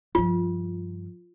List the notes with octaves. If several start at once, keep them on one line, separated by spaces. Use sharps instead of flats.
G2 F3 F4